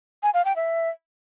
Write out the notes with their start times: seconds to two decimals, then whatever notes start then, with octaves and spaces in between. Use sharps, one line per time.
0.23 G#5
0.34 F5
0.45 G5
0.56 E5